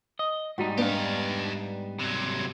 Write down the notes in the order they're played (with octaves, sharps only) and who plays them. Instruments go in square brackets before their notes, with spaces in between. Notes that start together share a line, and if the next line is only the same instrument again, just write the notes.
[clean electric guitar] D#5
[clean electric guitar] G#2 G3 D#4 [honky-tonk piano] F#4
[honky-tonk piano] B3 D4 [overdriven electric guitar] G4 F5
[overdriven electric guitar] C3 F#3